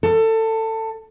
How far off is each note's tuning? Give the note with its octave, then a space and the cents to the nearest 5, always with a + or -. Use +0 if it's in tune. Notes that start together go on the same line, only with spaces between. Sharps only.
A4 +20